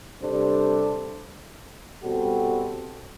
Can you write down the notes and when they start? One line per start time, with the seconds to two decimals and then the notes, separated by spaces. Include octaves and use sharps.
0.21 C3 G3 D4 A4 C5
2.02 B2 G3 C4 F#4 A4